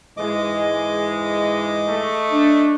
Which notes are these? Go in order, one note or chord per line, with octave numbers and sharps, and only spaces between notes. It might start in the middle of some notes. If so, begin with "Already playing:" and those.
G#2 E3 G#3 D#5 D6
A3
D4